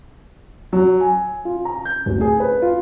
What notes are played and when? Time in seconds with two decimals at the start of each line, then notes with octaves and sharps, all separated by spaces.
0.73 F#3
1.00 G#5
1.45 F4
1.65 A#5
1.85 G6
2.06 D1
2.21 G#4
2.40 B4
2.62 F4